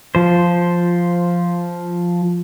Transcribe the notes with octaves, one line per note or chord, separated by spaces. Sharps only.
F3 C5